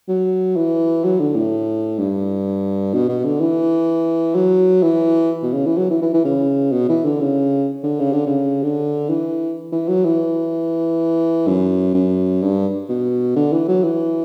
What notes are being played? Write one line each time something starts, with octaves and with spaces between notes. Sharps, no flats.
F#3
E3
F#3
D3
A2
G2
B2
B2
D3
E3
F#3
E3
B2
C#3
E3
F#3
E3
E3
E3
C#3
B2
E3
D3
C#3
D3
C#3
D3
C#3
D3
E3
E3
F#3
E3
F#2
F#2
G2
B2
D3
E3
F#3
E3